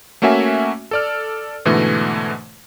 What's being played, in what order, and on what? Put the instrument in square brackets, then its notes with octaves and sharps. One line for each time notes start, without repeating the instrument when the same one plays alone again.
[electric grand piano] A3 A#3 C#4 F#4 E5 G#5
A4 D5 F6
G#2 B2 D3 E3 A3